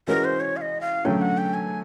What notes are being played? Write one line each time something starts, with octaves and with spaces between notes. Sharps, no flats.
E3 G#3 C#4 F#4 A#4
C5
C#5
F5
D#5
F5
D3 F#3 A3 C#4 G5
F#5
G5
G#5